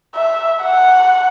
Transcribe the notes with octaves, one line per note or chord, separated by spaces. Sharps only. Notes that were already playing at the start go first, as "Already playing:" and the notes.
E5
F#5